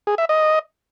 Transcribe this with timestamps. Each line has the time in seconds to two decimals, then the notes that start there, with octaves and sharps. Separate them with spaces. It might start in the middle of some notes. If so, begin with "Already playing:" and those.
0.07 G#4
0.18 E5
0.29 D#5